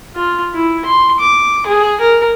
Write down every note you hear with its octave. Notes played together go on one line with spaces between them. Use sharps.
F4
E4
C6
D6
G#4
A#4